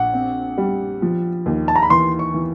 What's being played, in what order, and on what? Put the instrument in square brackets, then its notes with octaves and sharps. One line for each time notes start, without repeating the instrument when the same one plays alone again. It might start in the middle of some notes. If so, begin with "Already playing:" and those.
Already playing: [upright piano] A#1 [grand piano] F#5
[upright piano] C4
G3
F3
D#2
[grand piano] A5
A#5
B5
[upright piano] E3 [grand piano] C6
[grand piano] C#6
[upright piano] E3